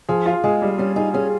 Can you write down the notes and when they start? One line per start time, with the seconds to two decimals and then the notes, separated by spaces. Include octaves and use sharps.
0.09 F3 G#4
0.26 F4
0.44 G#3 G#4
0.62 G3
0.78 G3 C#4
0.96 D#4 G#4
1.14 C#4 G#4